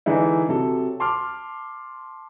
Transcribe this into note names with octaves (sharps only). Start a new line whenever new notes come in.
D3 E3 G#3 D#4 E4
C3 F#3 A4
A5 C6 D6 F6